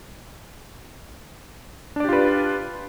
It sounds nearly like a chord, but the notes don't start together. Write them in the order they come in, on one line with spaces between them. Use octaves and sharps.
D4 D5 G4 F4 B4